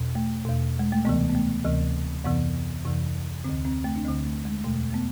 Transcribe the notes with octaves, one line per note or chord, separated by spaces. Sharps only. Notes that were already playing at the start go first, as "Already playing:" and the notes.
Already playing: E2 B2
A3
E2 B2
G#3
A3
D2 C3 E3 B3
B3
A3
D2 C3 E3
F2 C3 E3 B3
F2 C3 E3
D2 D3 C4
C4
A3
D4
D2 D3 C4
A3
G#3
E2 B2 A3
A3
B3